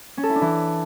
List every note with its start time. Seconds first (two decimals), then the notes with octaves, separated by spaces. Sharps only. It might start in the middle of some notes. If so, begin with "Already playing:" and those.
0.17 C#4
0.23 A4
0.29 E4
0.35 D4
0.41 E3